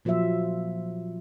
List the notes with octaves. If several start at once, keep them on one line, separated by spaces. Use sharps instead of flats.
A#2 F3 F#3 C5 E5